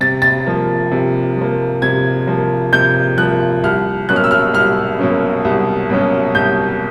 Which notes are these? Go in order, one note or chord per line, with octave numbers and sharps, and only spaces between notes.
C3 A6
A6
F3 A#3
C3
F3 A#3
C3 G#6
F3 A#3
C3 G6
F3 A#3 F#6
C2 F6
B2 F#3 A#3 C#4 F#6
F6
E6
F6
C2 F6
B2 F#3 A#3 C#4
C2
B2 F#3 A#3 C#4
C2 G6